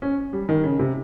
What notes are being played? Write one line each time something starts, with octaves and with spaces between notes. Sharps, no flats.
C#4
G3
D#3
C#3
C3